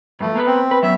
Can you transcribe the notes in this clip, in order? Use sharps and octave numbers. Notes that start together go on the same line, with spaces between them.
G2 F3 A3
A#3 B3 B4
C4
B4
F#3 B3 C#4 E5